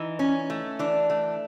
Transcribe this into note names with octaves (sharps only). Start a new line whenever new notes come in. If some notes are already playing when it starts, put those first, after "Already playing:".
Already playing: E3 D#4
C#4
A3
E3 D4
A3